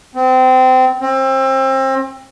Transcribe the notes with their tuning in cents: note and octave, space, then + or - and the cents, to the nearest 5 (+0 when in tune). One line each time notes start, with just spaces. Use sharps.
C4 -25
C4 +30